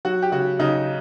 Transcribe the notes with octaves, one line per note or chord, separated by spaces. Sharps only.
F#3 F#4
G4
C#3 F#4
C#3 D#4